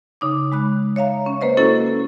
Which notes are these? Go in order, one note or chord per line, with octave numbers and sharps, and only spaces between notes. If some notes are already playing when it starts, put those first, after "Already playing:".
C#3 D#4 D6
G#3 B5 F#6
C#5 E5 F5 A#5
C#4
A#3 B4 C5 D#5
A#3 C#4 E4 F#4 A4